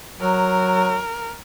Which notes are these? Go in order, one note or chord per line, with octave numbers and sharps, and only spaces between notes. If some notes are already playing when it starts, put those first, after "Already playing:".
F#3 A#4